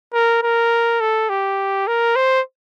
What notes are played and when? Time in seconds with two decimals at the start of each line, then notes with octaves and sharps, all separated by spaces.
0.13 A#4
0.42 A#4
1.00 A4
1.29 G4
1.87 A#4
2.16 C5